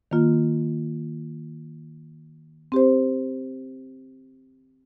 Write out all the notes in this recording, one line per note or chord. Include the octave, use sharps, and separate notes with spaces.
D#3 A#3 F4
C4 G4 C5